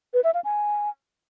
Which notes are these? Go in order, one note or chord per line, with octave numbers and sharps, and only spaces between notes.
B4
E5
F5
G#5